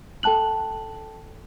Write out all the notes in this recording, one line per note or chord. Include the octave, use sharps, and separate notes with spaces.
A4 G5 A5 F#6 F#7